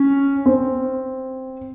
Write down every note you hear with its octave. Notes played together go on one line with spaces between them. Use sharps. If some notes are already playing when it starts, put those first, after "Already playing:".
Already playing: C#4
C4